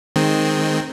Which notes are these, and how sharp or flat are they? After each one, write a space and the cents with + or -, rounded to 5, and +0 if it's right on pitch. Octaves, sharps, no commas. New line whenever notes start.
D#3 -5 G#3 +0 C4 +0